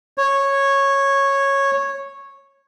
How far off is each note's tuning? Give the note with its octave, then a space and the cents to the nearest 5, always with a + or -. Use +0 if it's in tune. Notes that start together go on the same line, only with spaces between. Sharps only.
C#5 -10